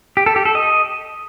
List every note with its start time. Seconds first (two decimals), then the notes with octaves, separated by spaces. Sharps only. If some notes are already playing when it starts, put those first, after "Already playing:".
0.17 G4
0.26 A4
0.36 G4
0.45 A4
0.55 D#5